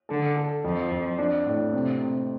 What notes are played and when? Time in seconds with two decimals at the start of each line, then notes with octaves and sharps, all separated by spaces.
0.09 D3 A4
0.37 A4
0.63 F2 F3
0.91 F2
1.19 D4
1.46 A2
1.73 C3
2.01 C3